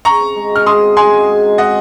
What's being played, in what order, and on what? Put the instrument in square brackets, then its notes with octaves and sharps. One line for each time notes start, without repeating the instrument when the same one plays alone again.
[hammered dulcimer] C#3 [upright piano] A#5 C#6
[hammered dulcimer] C4
G#3
[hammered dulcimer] F#4 [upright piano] F6
[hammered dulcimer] C#3 [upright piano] C6 D#6
[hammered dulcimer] C4
[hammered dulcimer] G#3 [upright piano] G#5 C6
[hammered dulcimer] F#4
G#3
D#4
[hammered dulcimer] C4 [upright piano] D#5 F#5